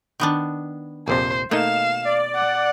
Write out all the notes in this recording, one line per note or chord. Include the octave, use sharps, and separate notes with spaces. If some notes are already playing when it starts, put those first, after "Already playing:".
D#3 B3 D4
A#1 F2 C3 C5
B2 A3 A#3 D#4 F5 E7
D5
F#5